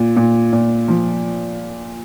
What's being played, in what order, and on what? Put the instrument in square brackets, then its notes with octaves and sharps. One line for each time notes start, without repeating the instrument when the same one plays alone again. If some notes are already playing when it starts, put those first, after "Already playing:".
Already playing: [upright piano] A#2
A#2
A#2
F3